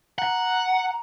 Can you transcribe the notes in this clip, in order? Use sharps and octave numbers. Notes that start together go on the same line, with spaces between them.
F#5 A#5